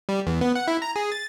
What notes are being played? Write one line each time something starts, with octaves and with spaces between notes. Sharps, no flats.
G3
E2
B3
F#5
E4
A#5
G#4
A6